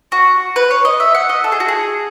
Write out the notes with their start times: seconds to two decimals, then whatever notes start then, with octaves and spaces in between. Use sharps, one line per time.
0.12 F#4
0.56 B4
0.71 C#5
0.85 D#5
1.00 E5
1.15 F#5
1.29 D#5
1.44 A4
1.52 G#4
1.60 F#4
1.68 G#4